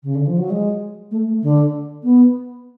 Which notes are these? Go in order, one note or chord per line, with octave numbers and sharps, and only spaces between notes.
C#3
D3
F3
F#3
G#3
A3
A3
D3
B3